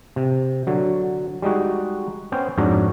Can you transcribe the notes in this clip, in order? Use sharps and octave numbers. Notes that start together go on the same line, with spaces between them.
C3
D3 F#3
G3 G#3 D#4 F#4
B3 C#4 C5 G5
F2 G#2 C#4 D4 F#4 A#5